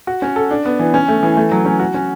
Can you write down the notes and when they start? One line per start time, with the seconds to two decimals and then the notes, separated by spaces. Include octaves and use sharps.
0.07 F#4
0.22 C#4
0.36 A4
0.51 D4
0.66 B3
0.79 E3
0.94 C#4
1.08 A3
1.23 E3
1.37 A3
1.52 F#3
1.65 C#4
1.80 F#4
1.94 C#4